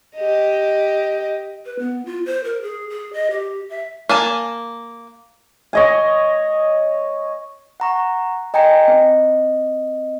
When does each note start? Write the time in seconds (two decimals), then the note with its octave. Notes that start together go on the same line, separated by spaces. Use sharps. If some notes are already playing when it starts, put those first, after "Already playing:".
0.16 G4 D#5
1.65 B4
1.79 B3
2.06 F4
2.26 C5
2.44 A#4
2.62 G#4
2.90 G#4
3.13 D#5
3.31 G4
3.70 E5
4.09 A#3 G#5 A5
5.73 C#5 D#5 G#5
7.80 F#5 A#5 C#6
8.54 D#5 G5 G#5 A#5 C#7
8.85 C4 D#5